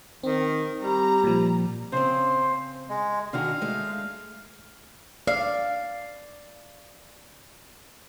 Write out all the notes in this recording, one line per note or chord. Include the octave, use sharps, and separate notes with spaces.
D#3 C4
G3 A#5
A#2 F3
C#3 C4 C5
G#3
D3 D#3 F#4 F5
G#3 A3
D5 F5